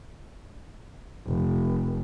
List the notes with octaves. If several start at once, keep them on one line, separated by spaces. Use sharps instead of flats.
F1